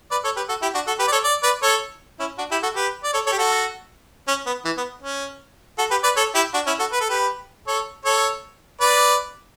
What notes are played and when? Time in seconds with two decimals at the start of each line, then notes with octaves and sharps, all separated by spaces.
0.11 B4 D5
0.24 A4 C#5
0.37 G4 B4
0.49 F#4 A4
0.62 E4 G4
0.75 D4 F#4
0.87 F#4 A4
0.99 G4 B4
1.08 D5
1.12 A4 C#5
1.24 D5
1.43 B4 D5
1.63 A4 C#5
2.20 C#4 E4
2.38 D4 F#4
2.52 E4 G4
2.63 F#4 A4
2.76 G4 B4
3.04 D5
3.13 A4 C#5
3.27 A4 C#5
3.32 G4
3.39 F#4 A4
4.28 C#4
4.46 B3
4.65 E3
4.78 B3
5.03 C#4
5.79 F#4 A4
5.91 G4 B4
6.04 B4 D5
6.17 A4 C#5
6.35 E4 G4
6.54 D4 F#4
6.67 C#4 E4
6.80 F#4 A4
6.92 B4
7.00 A4
7.09 G4 B4
7.67 A4 C#5
8.06 A4 C#5
8.81 B4 D5